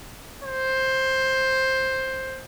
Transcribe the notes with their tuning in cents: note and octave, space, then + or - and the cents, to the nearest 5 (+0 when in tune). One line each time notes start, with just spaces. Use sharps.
C5 +10